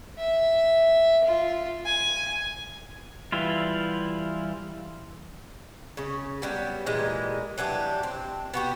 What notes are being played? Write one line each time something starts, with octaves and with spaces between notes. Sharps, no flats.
E5
F4
G#5
E3 G3 E4 F4
C#3 C#4
F#3 G3 B3
A#2 E3 G3 G#3
E3 F#3 D4 G4
C4
B3 F#4 G4